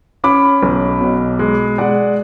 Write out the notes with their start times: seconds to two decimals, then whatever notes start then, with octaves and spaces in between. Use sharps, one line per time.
0.24 C#4 B5 D6
0.63 B1
1.01 B2
1.39 G#3
1.78 G#3 D5 F#5